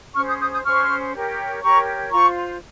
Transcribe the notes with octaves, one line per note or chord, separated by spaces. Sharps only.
C#4 G#4 C5 C#6 F6
D#6 G6
D#6 G6
D#6 G6
C#4 G#4 C5 C#6 F6
G4 A#4 C#5
G4 A#4 C#5 A#5 C#6
F4 C5 A#5 C#6